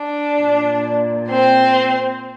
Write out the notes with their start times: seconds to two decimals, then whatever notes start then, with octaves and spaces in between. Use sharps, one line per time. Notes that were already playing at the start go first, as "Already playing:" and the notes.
Already playing: D4 D5
0.39 A#2
1.29 C4 C5